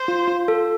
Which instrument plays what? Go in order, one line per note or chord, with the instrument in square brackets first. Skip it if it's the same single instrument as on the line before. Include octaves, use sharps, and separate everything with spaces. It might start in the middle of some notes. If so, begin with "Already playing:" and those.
Already playing: [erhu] C5
[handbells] F4
F4
A4